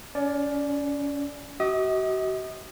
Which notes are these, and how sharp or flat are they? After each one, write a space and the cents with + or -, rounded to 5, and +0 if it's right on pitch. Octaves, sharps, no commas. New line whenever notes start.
C#4 +30 D5 +0
F#4 +40 D#5 +45 D#6 -30